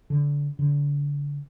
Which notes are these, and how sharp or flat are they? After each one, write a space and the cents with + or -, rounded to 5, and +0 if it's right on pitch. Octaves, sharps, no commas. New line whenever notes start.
D3 -25
D3 -35